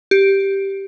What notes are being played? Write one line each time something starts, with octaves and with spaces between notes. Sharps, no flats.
G4